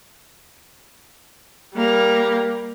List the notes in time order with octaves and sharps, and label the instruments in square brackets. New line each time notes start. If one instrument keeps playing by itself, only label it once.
[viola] G3 A#3